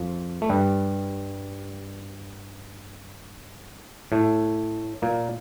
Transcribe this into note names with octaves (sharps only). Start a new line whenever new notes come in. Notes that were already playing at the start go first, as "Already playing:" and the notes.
Already playing: F2 F3
A3
G2 G3
A2 A3
A#2 A#3